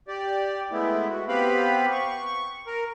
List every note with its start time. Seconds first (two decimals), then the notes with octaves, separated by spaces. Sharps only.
0.08 G4 D5
0.71 G#3 A3 B3 E4
1.10 F#4
1.28 B3 C4 G4 B4 F5 B5
1.92 C#6
2.67 A#4